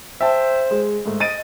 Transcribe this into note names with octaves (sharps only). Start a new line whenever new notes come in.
C5 E5 G5 A5
G#3
G#2 A3
D#5 A6 D7 D#7